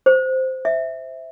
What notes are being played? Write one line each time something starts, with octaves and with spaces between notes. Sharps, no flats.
C5
E5